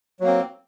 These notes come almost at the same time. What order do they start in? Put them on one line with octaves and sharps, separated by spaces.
F#3 A#3 C4